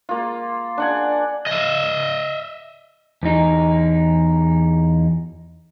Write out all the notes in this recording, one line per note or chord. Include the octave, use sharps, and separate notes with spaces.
A#3 F4
D4 F#5 G#5
D#5 E5
E2 D#4